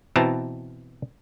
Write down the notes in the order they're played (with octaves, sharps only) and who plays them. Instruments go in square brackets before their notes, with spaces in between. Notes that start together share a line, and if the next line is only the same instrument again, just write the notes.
[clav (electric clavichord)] B2 E3 C4 A5 A#5